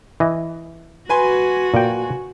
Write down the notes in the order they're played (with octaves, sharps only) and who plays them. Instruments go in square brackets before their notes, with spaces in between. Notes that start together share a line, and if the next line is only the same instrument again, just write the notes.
[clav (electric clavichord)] E3 D#5
[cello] F#4 [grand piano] B4 G#5 C6
[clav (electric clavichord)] A#2 G5